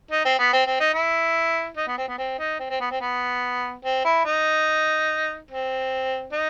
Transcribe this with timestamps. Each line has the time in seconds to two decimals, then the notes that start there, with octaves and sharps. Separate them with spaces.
0.11 D#4
0.25 C4
0.39 B3
0.53 C4
0.66 C4
0.80 D#4
0.94 E4
1.77 D#4
1.87 B3
1.98 C4
2.08 B3
2.18 C4
2.39 D#4
2.59 C4
2.70 C4
2.80 B3
2.91 C4
3.01 B3
3.84 C4
4.05 E4
4.25 D#4
5.50 C4
6.33 D#4